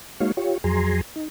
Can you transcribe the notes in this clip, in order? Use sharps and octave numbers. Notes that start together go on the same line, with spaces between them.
G#3 A#3 D#4 F#4 C#5 F5
F4 G4 C#5
F2 F#3 G#4 G#5 A#5 C6
D#4